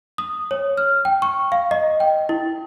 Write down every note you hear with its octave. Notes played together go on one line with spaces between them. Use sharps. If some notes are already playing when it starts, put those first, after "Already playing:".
D#6
C#5
F6
G5
C#6
F5
D#5
G5
E4